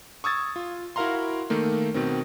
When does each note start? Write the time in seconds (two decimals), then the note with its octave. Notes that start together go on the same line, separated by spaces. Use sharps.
0.24 C#6 D#6 E6 G#6 A6
0.56 F4
0.96 E4 F#4 A#4 F5 A#5 C6
1.50 D#3 A3 A#3
1.94 B2 D#3 C4